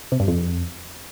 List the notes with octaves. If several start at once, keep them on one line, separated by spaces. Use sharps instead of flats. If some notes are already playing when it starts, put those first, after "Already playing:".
C3
G2
F2